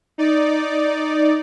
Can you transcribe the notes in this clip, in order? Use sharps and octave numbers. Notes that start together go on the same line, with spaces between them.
D#4 D5